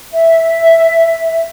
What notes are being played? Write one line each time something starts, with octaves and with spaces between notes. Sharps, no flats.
E5